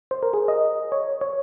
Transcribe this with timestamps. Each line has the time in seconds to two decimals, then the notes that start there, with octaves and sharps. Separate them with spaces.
0.11 C5
0.23 A#4
0.34 G#4
0.48 D#5
0.92 C#5
1.21 C#5